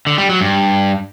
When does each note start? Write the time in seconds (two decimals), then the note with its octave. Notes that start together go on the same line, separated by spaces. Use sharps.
0.07 D3
0.18 G3
0.29 F#3
0.41 G2